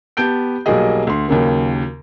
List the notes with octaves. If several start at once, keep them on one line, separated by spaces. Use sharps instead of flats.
B3 G4 A5 G6 D7
B1 F#3 G3 A#3 G#4 D#5
D2 C6
D#2 C#3 F#3 A#3